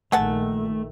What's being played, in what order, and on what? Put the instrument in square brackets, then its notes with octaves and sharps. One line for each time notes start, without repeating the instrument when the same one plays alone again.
[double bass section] A#1 A#2 D#3 [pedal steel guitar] A3 [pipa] G#4 F#5 A5